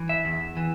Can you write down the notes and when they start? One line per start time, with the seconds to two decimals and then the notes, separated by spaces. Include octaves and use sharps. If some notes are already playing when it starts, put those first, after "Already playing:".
Already playing: E3
0.09 E5
0.25 E2
0.57 E3